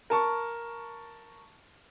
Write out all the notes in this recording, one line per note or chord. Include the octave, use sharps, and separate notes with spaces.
A#4 A5 C#6